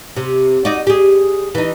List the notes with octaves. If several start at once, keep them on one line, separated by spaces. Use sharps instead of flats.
C3
D#4 F#4 D5
G4 G#4
E3 D#4